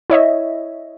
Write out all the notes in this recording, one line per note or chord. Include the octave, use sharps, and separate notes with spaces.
E4 C#5 D#5 E5